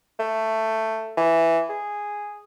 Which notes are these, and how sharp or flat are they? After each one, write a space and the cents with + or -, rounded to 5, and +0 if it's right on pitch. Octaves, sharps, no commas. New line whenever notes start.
A3 +10
E3 +5
G#4 -5